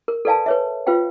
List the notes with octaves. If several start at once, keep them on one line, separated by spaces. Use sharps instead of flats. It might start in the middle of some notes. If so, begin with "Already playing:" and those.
A#4
A4 B4 D5 F5 G#5 A5
B4 C#5 E5
F4 B4 C5 F5 G5